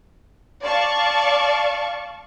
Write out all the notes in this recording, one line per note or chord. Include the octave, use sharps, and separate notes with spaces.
D5 F5 A5 C#6